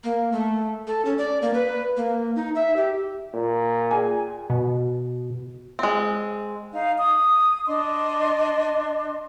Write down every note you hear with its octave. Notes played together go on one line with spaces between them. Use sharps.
A#3
A3
A4
C#4
D5
A#3
B4
A#3
D#4
E5
G4
A#2
G#4 G#5
B2
G#3 C4
D#4 F5
D#6
D4 D#5 C6